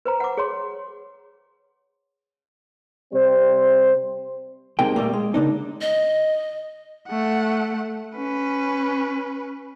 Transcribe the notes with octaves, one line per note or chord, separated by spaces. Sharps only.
B4 C5 A#5
F#5 D6
G#4 C#5 C6
C3 G3 C4 C5
C2 C3 G#3 A#3 D#4 G5
A#2 G3 A3 A#3
G#3
C#3 A#3 D4 D#4
D#5
A3 F#5
C#4 B4